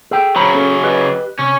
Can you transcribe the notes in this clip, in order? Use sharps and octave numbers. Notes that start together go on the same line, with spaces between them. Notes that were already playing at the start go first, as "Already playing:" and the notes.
G#4 A4 G5
C#3 F#3 C5 A#5 B5
C#4 A4
G4 B4 D#5
C3 C#4